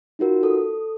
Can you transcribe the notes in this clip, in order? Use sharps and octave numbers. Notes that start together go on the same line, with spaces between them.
D#4 F4 F#4 A#4
A4 D#6